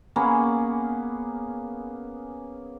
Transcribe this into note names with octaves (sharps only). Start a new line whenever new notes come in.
A#3 B3 C#4 G#4